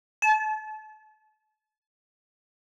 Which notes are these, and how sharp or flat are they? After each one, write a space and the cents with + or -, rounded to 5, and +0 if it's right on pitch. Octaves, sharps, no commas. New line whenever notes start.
A5 -35